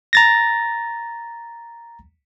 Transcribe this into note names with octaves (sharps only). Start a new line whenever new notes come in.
A#5 A6 A#6